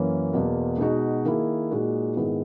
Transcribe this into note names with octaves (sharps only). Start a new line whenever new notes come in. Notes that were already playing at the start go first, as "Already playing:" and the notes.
Already playing: F#2 E3 A#3 C#4
E2 B2 A#3
B2 G#3 D#4 F#4
D#3 A#3 E4 G#4
A#2 G#3 D#4 F#4
G#2 D#3 G#3 B3 E4